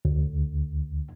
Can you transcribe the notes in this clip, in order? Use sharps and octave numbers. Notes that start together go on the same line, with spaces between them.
D2